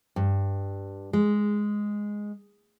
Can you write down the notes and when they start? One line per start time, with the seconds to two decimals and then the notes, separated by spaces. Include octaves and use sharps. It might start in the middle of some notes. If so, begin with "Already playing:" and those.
0.16 G2
1.13 G#3